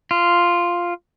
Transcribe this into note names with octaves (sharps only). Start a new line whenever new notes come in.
F4